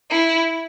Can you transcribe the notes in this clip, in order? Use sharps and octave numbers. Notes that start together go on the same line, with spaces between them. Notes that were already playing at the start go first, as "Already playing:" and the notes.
E4